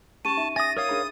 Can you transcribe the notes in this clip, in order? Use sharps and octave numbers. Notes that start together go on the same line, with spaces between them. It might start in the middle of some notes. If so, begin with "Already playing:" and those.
C#4 G4 A5 C#6 D#7
D#4 E5
E5 G#5 D#6 A6 A#6
A#4 C#5 F5 D#6
D4 G#4 B5